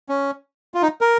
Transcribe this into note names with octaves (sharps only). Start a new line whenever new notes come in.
C#4
F4
D#4
A#4